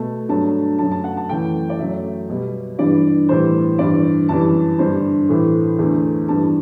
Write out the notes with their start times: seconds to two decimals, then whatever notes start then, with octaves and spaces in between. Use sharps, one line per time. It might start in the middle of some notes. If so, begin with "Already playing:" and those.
Already playing: B2 A3 A5
0.29 G2 F#3 A3 A5
0.79 F#2 F#3 A3 A5
0.92 A5
1.04 F#5
1.17 A5
1.29 F#2 E3 A3 G5
1.69 D5
1.79 F#2 F#3 A3 E5
2.29 B2 G3
2.79 G2 E3 G3 D5
3.29 A2 E3 G3 C5
3.79 G2 E3 G3 D5
4.29 F#2 E3 G3 A5
4.79 G2 D3 G3 C5
5.29 A2 E3 A3
5.79 E2 D3 A3
6.28 G2 E3 G3 A5